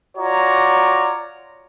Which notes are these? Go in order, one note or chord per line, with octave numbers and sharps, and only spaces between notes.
F4 F#4 C#5 D5 A#5